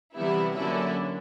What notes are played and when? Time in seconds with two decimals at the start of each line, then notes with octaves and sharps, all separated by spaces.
0.15 C3 E3 G3 B3 E4
0.54 D3 F#3 A#3 C#4 E4